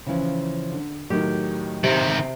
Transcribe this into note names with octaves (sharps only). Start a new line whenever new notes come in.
C#3 E3 F3
D3
A2 D#3 F#3 G4
C3 D#3 C4 D7